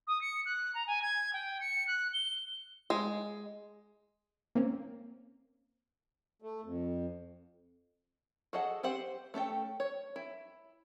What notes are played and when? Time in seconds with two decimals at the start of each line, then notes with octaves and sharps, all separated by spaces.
0.07 D#6
0.21 C#7
0.45 F#6
0.74 A#5
0.87 G#5
1.02 G#6
1.33 G5
1.60 C#7
1.87 F#6
2.13 G7
2.90 G#3
4.55 A#3 C4 C#4
6.42 A3
6.65 F2
8.53 F#4 G#4 A4 D#5 F#5
8.83 C4 G4 C5 F#5
9.34 A3 C#4 A4 G5
9.80 C#5
10.16 E4